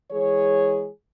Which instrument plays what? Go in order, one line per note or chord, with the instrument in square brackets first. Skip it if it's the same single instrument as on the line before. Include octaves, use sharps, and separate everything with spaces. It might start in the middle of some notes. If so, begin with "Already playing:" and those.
[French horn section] E3 G#3 G#4 C#5